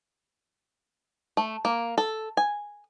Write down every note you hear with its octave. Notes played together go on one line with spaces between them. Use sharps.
A3
A#3
A4
G#5